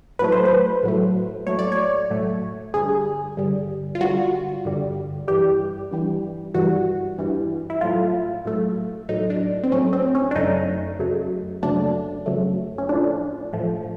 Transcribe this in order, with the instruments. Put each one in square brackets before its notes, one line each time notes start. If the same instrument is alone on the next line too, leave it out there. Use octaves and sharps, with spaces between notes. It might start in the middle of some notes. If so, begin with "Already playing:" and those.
[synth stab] A2 F#3 A3 B4
C5
B4
A2 F#3 A3
A2 F#3 A3 C#5
D5
C#5
A2 F#3 A3
G2 D3 G3 G#4
G2 D3 G3
F4
G2 D3 G3 F#4
G2 D3 G3
G2 E3 G3 G4
G2 E3 G3
G2 E3 G3 F#4
G2 E3 G3
E4
A2 F#3 A3 F4
A2 F#3 A3
A2 F#3 A3 D#4
D4
C4
A2 F#3 A3 C#4
C4
C#4
D4
F#2 C#3 F#3 A3 D#4
F#2 C#3 F#3 A3
F#2 C#3 F#3 A3 D4
F#2 C#3 F#3 A3
C#4
A2 F3 A3 D4
A2 F3 A3